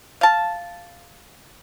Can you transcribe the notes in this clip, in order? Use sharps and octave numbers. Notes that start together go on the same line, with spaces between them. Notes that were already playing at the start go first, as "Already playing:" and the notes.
F5 A5